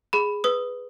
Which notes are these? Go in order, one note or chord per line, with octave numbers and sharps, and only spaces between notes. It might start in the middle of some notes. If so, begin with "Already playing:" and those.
G#4 B5
B4 D#6